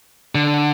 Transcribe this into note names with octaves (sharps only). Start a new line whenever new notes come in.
D3